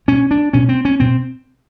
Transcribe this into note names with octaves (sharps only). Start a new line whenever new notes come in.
B2 C#4
D4
B2 C#4
C4
C#4
B2 C4